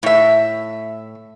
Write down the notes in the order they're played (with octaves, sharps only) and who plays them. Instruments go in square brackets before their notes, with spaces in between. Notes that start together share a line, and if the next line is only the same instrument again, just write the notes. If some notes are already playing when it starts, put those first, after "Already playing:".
[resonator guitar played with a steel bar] A2 E5